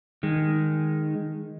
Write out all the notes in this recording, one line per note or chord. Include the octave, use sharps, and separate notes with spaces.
D#3 G#3